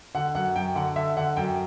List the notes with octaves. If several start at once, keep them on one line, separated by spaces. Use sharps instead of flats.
D3 F#5
F#2 F#5
F#2 G5
D3 F#5
D3 E5
D3 F#5
F#2 G5